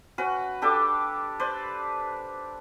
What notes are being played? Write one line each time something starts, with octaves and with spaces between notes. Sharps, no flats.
C#4 F#4 B4
D4 G4 A4 D6
B4 C5 D5